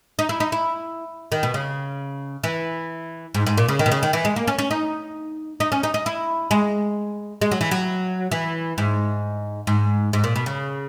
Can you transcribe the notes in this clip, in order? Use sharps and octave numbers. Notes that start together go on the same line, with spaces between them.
D#4
E4
D#4
E4
D#3
B2
C#3
E3
G#2
G#2
A#2
C#3
D#3
B2
C#3
D#3
E3
G#3
A#3
C#4
C#4
D#4
D#4
C#4
D#4
D#4
E4
G#3
G#3
F#3
E3
F#3
E3
G#2
G#2
G#2
A#2
B2
C#3